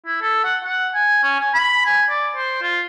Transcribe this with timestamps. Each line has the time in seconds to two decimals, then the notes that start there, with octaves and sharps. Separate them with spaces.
0.06 E4
0.22 A4
0.44 F#5
0.65 F#5
0.94 G#5
1.23 C#4
1.40 G#5
1.54 B5
1.86 G#5
2.10 D5
2.36 C5
2.62 F4